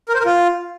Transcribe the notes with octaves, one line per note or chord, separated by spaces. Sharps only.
A#4
C5
A#4
F4